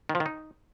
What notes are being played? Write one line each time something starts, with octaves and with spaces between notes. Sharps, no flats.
D#3
F3
D#3
D#4